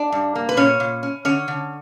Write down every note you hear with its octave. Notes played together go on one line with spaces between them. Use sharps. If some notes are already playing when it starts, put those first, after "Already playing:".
Already playing: D4 D5
G2
A#3
B4
A#2 C#4 C#5
A#2
C#4
D3 C#4 C#5
D3